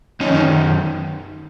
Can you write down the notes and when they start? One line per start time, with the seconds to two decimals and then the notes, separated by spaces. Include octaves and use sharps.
0.20 F#2 C#4 D#4
0.25 D#3
0.32 C#4 D#4